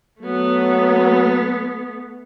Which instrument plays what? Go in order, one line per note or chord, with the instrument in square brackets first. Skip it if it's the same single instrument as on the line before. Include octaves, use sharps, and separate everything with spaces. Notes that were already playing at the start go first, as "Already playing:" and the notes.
[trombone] F#3 [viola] A3 B3